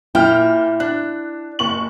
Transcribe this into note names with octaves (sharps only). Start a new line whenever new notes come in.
A#2 E4 G5 F6
D4 F#6
F#1 C#6 F#7